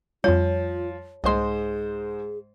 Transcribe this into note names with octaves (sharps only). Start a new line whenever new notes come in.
F2 F3 G3 F4 C#5
C2 G#2 G#4 C5 D#5 C6